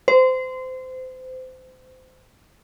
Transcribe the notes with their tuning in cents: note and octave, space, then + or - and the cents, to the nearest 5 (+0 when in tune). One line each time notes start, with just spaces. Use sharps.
C5 -25